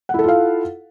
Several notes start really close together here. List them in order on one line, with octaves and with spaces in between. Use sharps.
F#5 E4 A4 F4 F5